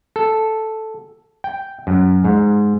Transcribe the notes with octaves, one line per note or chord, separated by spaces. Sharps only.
A4
G5
F#2
G#2